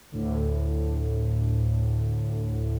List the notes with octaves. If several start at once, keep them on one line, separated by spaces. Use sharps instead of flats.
D2 A2 D3